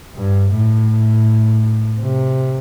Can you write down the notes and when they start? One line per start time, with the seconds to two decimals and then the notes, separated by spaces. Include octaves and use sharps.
0.16 G2
0.53 A2
2.01 C3